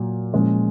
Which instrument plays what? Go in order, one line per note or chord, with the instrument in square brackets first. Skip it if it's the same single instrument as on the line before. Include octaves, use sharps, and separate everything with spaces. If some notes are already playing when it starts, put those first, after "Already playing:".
Already playing: [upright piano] A#2 F#3
A#2 F3 G#3 C#4